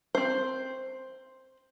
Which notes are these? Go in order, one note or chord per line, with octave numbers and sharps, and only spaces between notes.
C4 C5